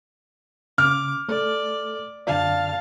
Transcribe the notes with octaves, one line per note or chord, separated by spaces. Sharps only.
C#3 D6 F6
A3 A4 D5
F#2 D3 D5 F5 A5